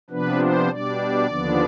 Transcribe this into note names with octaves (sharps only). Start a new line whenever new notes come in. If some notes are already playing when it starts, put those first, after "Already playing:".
C3 F3 B3 D4 B4
C5
B2 G3 D4 D5
D#2 D3 F3 B3 D4